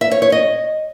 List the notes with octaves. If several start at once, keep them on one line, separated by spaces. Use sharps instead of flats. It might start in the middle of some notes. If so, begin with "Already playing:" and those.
E5
C#5
C#5
D#5